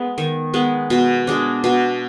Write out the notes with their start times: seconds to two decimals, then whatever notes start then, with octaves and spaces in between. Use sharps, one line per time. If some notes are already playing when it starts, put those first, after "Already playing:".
Already playing: G#3 B3
0.18 D#3
0.54 G#3 B3
0.90 B2
1.27 G#3 D4
1.64 B2